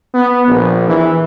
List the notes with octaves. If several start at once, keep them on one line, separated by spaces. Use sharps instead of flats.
B3
A#1
E3